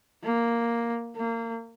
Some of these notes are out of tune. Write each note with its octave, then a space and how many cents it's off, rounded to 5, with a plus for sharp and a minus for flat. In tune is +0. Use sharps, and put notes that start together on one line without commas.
A#3 +0
A#3 -25